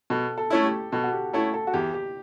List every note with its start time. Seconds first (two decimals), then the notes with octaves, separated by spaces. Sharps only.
0.10 B2 A4
0.38 A4
0.50 A3 C#4 E4
0.64 G4
0.92 B2 A4
1.04 F#4
1.13 G4
1.33 A3 C#4 E4 A4
1.54 A4
1.67 F#4
1.74 E2 G4
1.94 G4